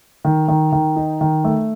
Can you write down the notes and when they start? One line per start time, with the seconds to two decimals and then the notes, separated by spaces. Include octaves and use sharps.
0.25 D#3
0.48 D#3
0.72 D#3
0.96 D#4
1.21 D#3
1.45 A3